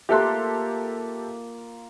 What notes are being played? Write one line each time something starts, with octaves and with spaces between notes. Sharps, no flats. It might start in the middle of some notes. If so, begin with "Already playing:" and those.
A#3 F4 G4 A4 E5 C6 F#6